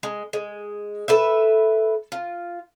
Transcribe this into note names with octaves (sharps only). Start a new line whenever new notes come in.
G#3
G#3
A4 B4 E5
F4